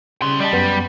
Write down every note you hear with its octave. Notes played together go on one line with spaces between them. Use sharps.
C#3 G3 C6
G3 D5 D#5 A5
F#2 B3